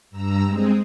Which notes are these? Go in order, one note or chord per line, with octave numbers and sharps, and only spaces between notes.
G2 A#5 E6
G#3 C4 G#4